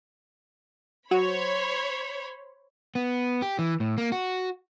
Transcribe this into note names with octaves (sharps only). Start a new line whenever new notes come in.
F#3 F#4 C5 C#5 B5
B3
G4
E3
A2
A#3
F#4